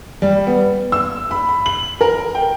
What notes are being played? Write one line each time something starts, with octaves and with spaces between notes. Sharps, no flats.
G3
B3
E6
B5
B5
F#7
A#4
G5